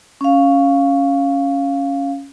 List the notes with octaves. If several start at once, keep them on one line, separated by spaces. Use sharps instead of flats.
C#4 F5